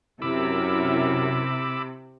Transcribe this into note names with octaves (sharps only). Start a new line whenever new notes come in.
F#2 C3 E4 A#4 B5 D6 E6